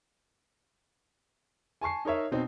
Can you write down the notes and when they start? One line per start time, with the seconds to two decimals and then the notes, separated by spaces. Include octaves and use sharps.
1.81 G#5 A5 C#6 C7
2.05 D#4 A#4 C#5 E5
2.31 B2 C4 D#4